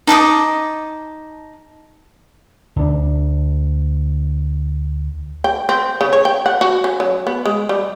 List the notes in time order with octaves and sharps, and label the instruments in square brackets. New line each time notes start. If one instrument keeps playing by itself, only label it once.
[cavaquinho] D#4 A5 D6 D#6
[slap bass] D2 D4
[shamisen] G5
C4
C#3
C#5
G5
F#5
F#4
C#4
F#3
B3
G#3
G3